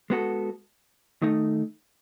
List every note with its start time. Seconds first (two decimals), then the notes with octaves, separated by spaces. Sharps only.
0.10 G#3 B3 F#4 A4
1.22 D#3 A3 D#4